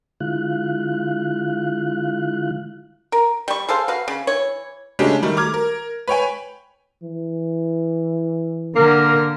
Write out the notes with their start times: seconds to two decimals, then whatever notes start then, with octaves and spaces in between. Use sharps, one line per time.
0.20 D3 G#3 E4 F4 F5 F#6
3.12 A#4
3.48 G3 C#6
3.69 G#4 A4 C5 F5
3.88 F#4 B4 F5
4.08 C#3
4.27 E3 C#5
4.99 C#3 G#3 A3 C#4 D4 G4
5.23 D#3 G3 A3
5.37 A#5 D6 F6 G#6
5.54 A#4
6.08 B4 C#5 G5 G#5
7.03 E3
8.76 D3 A#3 A#4